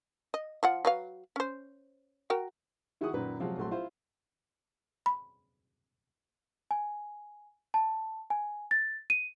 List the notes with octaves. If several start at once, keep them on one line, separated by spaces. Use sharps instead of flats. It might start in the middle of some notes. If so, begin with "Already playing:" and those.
D#5
F3 F4 F#5
F#3 B4 F5
C#4 C5
F#4 A#4 G5
D#3 E4 F#4 G#4 F#5 D#6
F#2 A#2 D#3 B4
C3 F3 F#3 G#3 F5
A#1 F#3 A3 C4 C6
E4 F4 C5
B5
G#5
A5
G#5
A6
D#7